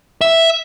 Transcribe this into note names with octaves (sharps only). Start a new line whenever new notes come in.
E5